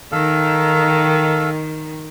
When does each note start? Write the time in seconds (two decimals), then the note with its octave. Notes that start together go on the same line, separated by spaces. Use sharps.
0.12 D#3 A4 F5